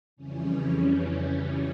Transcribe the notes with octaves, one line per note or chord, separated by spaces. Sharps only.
F2 C#3 E3 G3 C#4